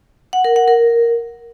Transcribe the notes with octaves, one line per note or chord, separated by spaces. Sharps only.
F#5
A#4
F#5
A#4